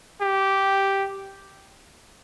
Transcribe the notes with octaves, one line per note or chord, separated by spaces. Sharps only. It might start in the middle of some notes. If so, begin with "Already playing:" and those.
G4